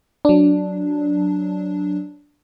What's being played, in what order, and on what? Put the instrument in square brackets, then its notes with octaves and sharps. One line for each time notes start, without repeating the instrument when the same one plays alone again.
[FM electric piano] F#3 D4